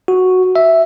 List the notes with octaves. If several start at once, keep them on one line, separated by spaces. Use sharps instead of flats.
F#4
E5